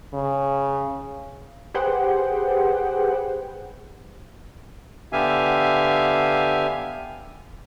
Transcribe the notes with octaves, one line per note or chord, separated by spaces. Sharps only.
C#3
G4 G#4 B4 C5 F#5 G5
D3 B3 G4 E5 F5 G#5